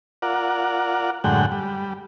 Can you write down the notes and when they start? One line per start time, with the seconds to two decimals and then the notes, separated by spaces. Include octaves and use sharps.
0.22 F4 A#4 D5 F#5
1.24 F#2 A2 D3 G#3 F#5 G5
1.52 G3